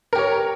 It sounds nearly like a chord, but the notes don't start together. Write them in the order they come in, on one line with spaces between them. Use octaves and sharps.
A#4 G4 C#5